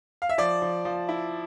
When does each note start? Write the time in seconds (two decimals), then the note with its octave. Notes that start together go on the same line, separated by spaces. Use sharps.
0.22 F5
0.29 E5
0.38 F3 D5
0.62 F3
0.85 F3
1.09 E4